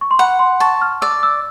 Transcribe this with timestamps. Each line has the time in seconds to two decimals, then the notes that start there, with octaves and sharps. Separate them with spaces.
0.01 C#6
0.11 C6
0.19 F#5 B5
0.39 C6
0.60 A5 C#6
0.82 F6
1.02 D5 E6
1.23 E6